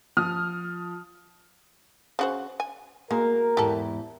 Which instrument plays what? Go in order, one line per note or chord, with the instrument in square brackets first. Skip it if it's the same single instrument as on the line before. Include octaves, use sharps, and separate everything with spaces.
[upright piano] F3 D#6 F6
[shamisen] C#3 F#4 C5
G#5
[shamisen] G#3 [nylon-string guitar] A#3 F#4 [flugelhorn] A#4
[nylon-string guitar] E2 G#2 E5 [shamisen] G4 A4